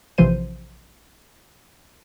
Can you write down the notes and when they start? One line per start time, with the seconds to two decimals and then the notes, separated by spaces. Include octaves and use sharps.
0.18 A#1 C3 E3 F3 C5 D#7